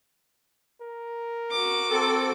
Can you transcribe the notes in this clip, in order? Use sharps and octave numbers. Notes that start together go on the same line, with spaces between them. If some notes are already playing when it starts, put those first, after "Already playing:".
A#4
F#4 D6
C4 A4